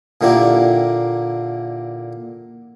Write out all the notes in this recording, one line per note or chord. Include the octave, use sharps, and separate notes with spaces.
A#2 D3 A#3 E4 G4